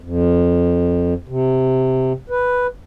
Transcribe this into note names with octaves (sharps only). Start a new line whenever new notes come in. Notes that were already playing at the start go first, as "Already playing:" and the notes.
F2
C3
B4